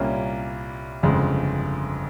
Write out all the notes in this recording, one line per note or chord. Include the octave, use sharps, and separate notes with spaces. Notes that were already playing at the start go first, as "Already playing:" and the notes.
Already playing: C2 A#2 G3 A#3 C#4
G1 F2 C#3 G#3